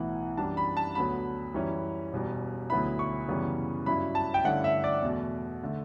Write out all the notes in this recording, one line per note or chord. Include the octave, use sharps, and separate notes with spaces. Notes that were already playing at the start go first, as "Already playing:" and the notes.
Already playing: B1 A2 E3 B3 E4 F#5
F#2 E3 G3 D4 A5
B5
A5
D2 D3 F#3 B3 B5
F#2 E3 G3 C#4 E4
E1 E2 B2 G3
D2 D3 F#3 B3 E4 B5
C#6
F#2 C#3 E3 G3 B3
G2 F#3 C#4 E4 B5
A5
G5
G2 D3 A3 C#4 E4 F#5
E5
D5
E2 B2 A3
D3 A3